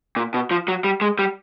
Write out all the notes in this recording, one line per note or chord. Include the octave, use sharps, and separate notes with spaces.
A#2
B2
F3
F#3
G3
G#3
G3